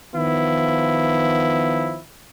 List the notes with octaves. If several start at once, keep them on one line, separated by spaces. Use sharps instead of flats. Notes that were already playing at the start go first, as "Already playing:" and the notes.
D#3 F3 B3 E4